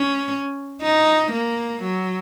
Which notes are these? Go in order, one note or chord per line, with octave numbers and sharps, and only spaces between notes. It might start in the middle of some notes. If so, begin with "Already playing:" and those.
Already playing: C#4
D#4
A#3
F#3